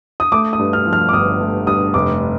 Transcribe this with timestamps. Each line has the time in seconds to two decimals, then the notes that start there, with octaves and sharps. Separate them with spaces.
0.20 D#6
0.32 A3 D6
0.53 D#6
0.59 G2
0.73 F6
0.86 F3
0.93 F6
1.09 D6
1.13 G1 D#6
1.41 A3
1.67 G2 D#6
1.94 F1 D6